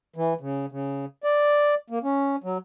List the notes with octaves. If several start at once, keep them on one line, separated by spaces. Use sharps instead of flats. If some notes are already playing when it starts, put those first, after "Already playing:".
E3
C#3
C#3
D5
A#3
C#4
F#3